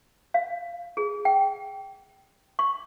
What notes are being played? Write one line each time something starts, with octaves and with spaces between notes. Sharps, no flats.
F5
G#4
G5
C#6